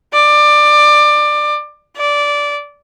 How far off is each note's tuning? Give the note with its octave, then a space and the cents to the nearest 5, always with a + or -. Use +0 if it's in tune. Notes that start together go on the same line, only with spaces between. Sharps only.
D5 +20
D5 -15